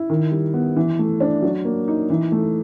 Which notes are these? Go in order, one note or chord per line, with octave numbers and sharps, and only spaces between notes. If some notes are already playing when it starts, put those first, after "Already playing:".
Already playing: E4
D#3
G3
B3
E3
A3
D4
F#3
A#3
D#4
E3
A3